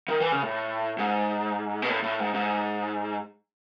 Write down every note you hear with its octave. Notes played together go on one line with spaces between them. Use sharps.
D#3
E3
C#3
A2
G#2
B2
A2
A2
G#2
G#2